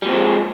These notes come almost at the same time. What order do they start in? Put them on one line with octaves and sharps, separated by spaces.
G3 A#2 C4 F3 G#3